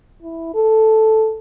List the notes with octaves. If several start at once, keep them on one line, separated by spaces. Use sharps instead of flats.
E4
A4